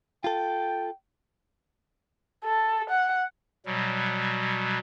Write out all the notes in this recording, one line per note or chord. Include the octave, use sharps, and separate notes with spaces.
F4 A4 G5
A4
F#5
B2 F#3 G3